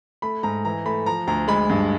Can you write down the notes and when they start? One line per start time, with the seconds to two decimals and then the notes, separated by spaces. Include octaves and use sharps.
0.22 A3 B5
0.43 G#2 A#5
0.65 E3 A#5
0.85 A3 B5
1.06 F3 A#5
1.27 D2 A#5
1.48 G#3 B5
1.70 G2